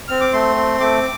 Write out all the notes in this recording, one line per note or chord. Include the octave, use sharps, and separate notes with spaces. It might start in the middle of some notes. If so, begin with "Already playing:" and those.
C4 F6
D6
A3 C6
C4
A3 D6